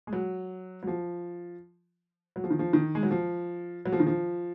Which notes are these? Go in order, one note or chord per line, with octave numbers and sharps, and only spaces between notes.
G#3
F#3
F#3
F3
F#3
F3
D#3
F3
D#3
G#3
F#3
F3
F#3
F3
D#3
F3